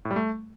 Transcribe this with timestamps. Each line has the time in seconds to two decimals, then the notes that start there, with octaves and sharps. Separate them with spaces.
0.05 A2
0.11 G3
0.16 A3